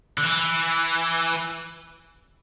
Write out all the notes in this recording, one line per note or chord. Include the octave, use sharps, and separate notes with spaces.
D3
E3